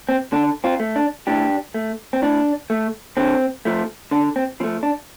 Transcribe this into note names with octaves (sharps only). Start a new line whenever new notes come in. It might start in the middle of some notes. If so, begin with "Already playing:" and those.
C4
D3 D4
C4 F4
A3
D4
A2 D4 G4
A3
C4
A2 D4
A3
D3 C4
F3 A3
D3 D4
C4
F3 A3 C4
D4